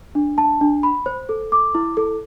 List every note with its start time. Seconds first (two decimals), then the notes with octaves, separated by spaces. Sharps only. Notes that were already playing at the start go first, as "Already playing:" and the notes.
0.15 D4
0.38 A5
0.61 D4
0.83 B5
1.06 C5
1.29 A4
1.52 D6
1.75 E4
1.97 A4